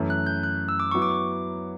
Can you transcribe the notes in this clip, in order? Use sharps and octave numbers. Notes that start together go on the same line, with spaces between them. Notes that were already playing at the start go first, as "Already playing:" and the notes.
Already playing: F#2 E3 A3
F#6
G6
F#6
E6
D6
F#3 B3 E4 C#6
D6